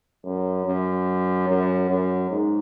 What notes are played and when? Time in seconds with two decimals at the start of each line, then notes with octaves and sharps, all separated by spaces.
0.24 F#2
0.66 F#2
1.48 F#2
1.89 F#2
2.30 G#2